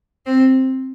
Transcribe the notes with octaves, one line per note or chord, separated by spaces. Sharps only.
C4